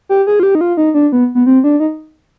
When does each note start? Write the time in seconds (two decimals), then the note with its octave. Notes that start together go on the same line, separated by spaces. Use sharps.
0.09 G4
0.27 G#4
0.40 F4
0.43 G4
0.55 D#4
0.61 F4
0.77 D#4
0.94 D4
1.12 B3
1.35 B3
1.46 C4
1.64 D4
1.80 D#4